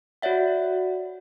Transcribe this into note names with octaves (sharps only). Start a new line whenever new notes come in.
F#4 C#5 D5 E5 F#5